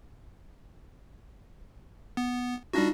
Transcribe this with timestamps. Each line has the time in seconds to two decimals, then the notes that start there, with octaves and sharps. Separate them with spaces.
2.17 B3
2.73 G3 D4 D#4 F4 F#4 A#6